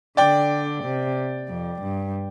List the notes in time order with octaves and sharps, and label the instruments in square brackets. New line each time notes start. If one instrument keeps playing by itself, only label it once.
[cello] D3 [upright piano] D5 G5
[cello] C3
F2
G2